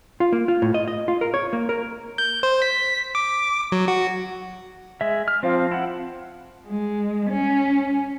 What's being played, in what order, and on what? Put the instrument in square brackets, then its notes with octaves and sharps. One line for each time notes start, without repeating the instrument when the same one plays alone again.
[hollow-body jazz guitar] F4
A#3
F4
A2
D#5
D#5
F4
A#4
C#5
A#3
A#4
[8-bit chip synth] G6
C5
B6
D6
F#3
F#4
[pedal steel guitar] G#3 E5
F6
[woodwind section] F3 [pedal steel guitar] C4 F5
[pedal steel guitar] E4 F#5
[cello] G#3
C#4